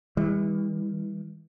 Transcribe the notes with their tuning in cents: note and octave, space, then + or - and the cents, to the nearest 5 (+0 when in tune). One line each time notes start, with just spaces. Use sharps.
E3 -30 G3 +40